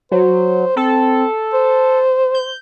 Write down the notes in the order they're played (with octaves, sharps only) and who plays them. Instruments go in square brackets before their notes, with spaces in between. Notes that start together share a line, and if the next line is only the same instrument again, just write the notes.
[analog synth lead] F#3 [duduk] C5
[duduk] C4 [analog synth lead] A4
[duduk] C5
[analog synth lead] G6